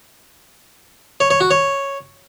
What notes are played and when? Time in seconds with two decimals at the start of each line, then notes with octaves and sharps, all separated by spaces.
1.20 C#5
1.30 C#5
1.41 F#4
1.51 C#5